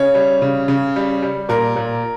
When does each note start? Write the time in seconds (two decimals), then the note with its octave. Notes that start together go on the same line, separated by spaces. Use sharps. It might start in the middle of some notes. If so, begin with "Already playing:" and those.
Already playing: C#3 C#5
0.15 G3
0.42 C#3
0.68 C#3
0.96 G3
1.22 G3
1.49 A#2 A#4
1.76 A#2